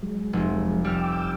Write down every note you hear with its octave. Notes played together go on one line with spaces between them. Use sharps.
F#3 G#3
F1
G3 G5 D6 E6 F6